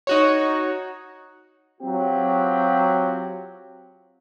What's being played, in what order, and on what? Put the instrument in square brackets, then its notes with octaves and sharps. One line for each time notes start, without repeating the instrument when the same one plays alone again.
[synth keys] D#4 F#4 C#5
[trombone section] F#3 C4 F4 G4